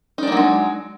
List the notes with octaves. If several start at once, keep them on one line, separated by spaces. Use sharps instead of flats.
F#3 G#3 A#3 D4 D#4